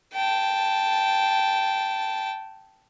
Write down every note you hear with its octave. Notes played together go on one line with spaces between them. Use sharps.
G5 A5